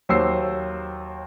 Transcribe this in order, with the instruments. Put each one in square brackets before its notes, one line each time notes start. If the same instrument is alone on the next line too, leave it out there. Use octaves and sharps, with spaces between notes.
[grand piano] D#2 F#3 G4 C5 E6 C7